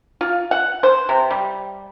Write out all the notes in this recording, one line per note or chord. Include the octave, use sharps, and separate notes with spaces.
F4
F#5
C5
C3
G3